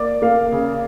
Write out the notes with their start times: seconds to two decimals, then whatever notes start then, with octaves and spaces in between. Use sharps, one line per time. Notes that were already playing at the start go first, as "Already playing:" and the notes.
Already playing: A#3 D5
0.22 A#3 F5
0.52 C#3